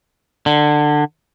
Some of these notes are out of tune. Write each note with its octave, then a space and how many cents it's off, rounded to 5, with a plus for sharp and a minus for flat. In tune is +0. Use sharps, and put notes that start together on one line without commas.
D3 +20